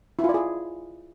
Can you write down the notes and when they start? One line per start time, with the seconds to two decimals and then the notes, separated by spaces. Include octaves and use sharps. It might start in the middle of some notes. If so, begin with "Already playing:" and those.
0.19 E4
0.24 F4
0.29 D5
0.34 G#4